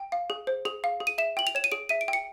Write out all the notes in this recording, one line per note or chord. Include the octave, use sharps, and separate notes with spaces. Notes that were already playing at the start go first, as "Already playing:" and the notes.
Already playing: G5
F5
G#4
C5
G#4 F7
F5
G#4
D#7
E5 E7
G5 F#7
F7
C#5 E7
D#7
G#4 D7
E5 D#7
D7
G5
C#7